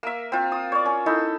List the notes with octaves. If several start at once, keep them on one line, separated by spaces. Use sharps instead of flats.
A#3 E5
C4 F4
D#6
C#5 D5
C#4
D#4 E4 A4